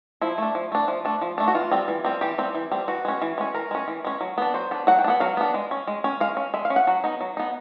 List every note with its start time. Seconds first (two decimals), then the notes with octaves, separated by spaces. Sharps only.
0.21 F3 E4
0.38 A3 D4
0.55 F3
0.72 A3 D4
0.88 F3
1.05 A3 D4
1.21 F3
1.38 A3 D4
1.48 F#4
1.55 E3 F4
1.71 G3 C4
1.88 E3
2.05 G3 C4
2.21 E3 G4
2.38 G3 C4
2.55 E3
2.71 G3 C4
2.88 E3 F#4
3.05 G#3 C#4
3.22 E3
3.38 G#3 C#4
3.54 E3 A#4
3.71 G#3 C#4
3.88 E3
4.04 G#3 C#4
4.21 F#3
4.38 B3 D4
4.54 F#3 C5
4.71 B3 D4
4.87 F#3 F#5
4.99 G5
5.04 D4
5.08 B3 F#5
5.20 F#3 F5
5.37 B3 D4
5.54 G#3
5.71 C#4
5.87 G#3
6.04 C#4
6.20 G#3 F5
6.37 C#4
6.54 G#3 E5
6.65 F5
6.70 C#4
6.76 F#5
6.87 F#3
7.04 B3 D#4
7.21 F#3
7.37 B3 D#4